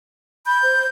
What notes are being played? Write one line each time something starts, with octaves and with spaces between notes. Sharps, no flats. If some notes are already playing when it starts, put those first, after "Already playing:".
B5 G6
C5